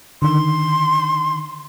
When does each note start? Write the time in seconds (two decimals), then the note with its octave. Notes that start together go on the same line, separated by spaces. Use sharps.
0.22 D3 D#3 C6